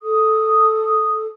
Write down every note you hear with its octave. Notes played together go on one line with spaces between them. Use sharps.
A4 D#6